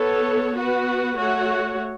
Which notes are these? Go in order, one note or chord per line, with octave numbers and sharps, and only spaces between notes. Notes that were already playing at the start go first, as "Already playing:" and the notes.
Already playing: B3 A4 C#5
B3 F#4 B4
A3 F#4 C#5